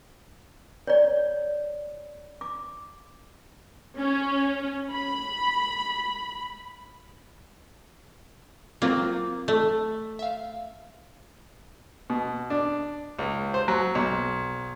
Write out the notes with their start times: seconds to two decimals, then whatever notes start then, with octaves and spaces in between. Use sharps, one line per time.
0.87 C#5 D5
2.41 D6
3.97 C#4
4.91 B5
8.82 F#3 A#3 C4 F4
9.48 A3
10.19 E5 F5
12.10 B2
12.50 D4
13.19 C#2
13.54 C5
13.68 F#3
13.95 B1